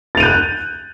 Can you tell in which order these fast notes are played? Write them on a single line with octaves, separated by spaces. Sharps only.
A6 F7 D#7 G6 F#6